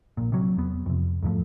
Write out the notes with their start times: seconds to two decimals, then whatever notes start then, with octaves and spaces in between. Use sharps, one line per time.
0.17 A#1 A#2
0.32 C3 F#3
0.57 E2 B3
0.86 F2 C3
1.23 E2 G#2 F3 A3